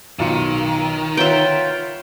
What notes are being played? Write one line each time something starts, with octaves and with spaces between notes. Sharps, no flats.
B1 D#3 F4 C#7
F4 B4 C#5 E5 F#5 G5